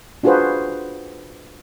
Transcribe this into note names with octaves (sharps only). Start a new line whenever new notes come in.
D4 F4 F#4 G#4 B4 C5